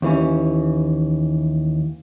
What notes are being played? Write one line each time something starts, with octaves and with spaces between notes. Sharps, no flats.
D#2 E3 C#4